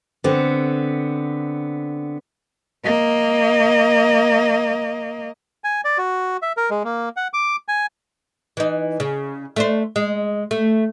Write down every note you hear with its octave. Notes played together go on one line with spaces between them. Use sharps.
D3 B3 C4
A#3 D#5
G#5
D5
F#4
E5
A#4
G#3
A#3
F#5
D6
G#5
E3 D#4
C#3
A3 D4 C5
G#3
A3